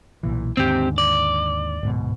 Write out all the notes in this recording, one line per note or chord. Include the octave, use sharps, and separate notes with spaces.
B1 A#2 E3
D#2 G#2 D3 C4 G4
D5
D1 G#2 B2